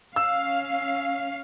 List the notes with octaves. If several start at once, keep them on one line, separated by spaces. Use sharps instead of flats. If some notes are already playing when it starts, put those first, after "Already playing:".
C#4 F5 E6